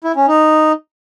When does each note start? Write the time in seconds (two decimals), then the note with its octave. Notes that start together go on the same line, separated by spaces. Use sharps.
0.04 E4
0.16 C#4
0.28 D#4